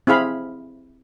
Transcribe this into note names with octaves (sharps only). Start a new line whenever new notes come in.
C4 E4 G#4 F5 B5